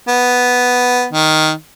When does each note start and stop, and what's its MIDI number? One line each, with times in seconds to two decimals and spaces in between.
0.09 1.06 59
1.13 1.50 51